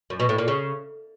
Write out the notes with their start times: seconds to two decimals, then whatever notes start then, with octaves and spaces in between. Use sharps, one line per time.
0.10 F#2
0.20 B2
0.29 A2
0.38 A#2
0.48 C#3